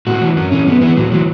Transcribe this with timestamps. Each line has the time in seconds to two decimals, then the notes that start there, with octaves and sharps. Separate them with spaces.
0.07 A2 F#4
0.21 E3
0.36 F#2 C#4
0.52 E3 C#4
0.67 F#2 B3
0.81 E3 B3
0.97 A2 F#3
1.12 E3 F#3